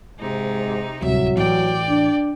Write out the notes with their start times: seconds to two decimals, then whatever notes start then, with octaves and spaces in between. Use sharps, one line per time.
0.19 G#2 C3 D#4
1.02 D1 C2 F#3 E5
1.37 A1 D5 G5
1.89 D4